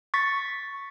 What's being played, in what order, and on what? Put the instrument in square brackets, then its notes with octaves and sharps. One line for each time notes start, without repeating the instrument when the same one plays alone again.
[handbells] C#6 A6 B6